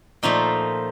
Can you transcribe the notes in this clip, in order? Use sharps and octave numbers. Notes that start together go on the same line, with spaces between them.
A#2 F3 A3 D#4